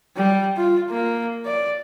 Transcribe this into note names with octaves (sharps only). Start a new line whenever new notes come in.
G3
F4
A#3
D5